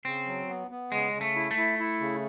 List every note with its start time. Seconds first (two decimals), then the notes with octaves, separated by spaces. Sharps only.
0.05 C#3 C4
0.26 F#3
0.49 B3
0.71 B3
0.92 C#3 G#3
1.14 C#3
1.21 A3
1.35 E4
1.51 A3
1.57 E4
1.79 E4
2.01 C#3